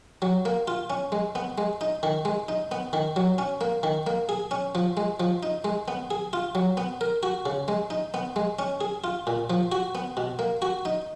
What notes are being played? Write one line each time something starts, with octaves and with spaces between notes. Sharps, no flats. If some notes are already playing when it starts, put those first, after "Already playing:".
F#3
A#3
F4
C#4
G#3
B3
G#3
D#4
D#3
G#3
D#4
B3
D#3
F#3
C#4
A#3
D#3
A#3
G#4
C#4
F3
G#3
F3
D#4
G#3
B3
G#4
F4
F#3
B3
A#4
F#4
C#3
G#3
D#4
B3
G#3
C#4
G#4
F4
A#2
F3
F#4
B3
B2
A#3
F#4
D#4